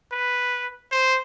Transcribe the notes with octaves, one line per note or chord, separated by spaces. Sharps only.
B4
C5